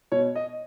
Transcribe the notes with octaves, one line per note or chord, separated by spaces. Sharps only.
B2 C#5
D#5